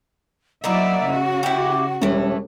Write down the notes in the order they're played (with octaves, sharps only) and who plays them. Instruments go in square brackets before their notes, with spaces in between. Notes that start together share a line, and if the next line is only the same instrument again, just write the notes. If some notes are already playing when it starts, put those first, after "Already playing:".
[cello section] F#3 D5 E5 [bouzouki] A#3 D#4 E4 [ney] F#5
[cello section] C#3 F#4
[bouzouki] E4 G4
[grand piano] E1 G3 C#4 [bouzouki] E3 A3